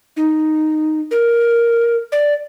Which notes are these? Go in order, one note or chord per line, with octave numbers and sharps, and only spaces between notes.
D#4
A#4
D5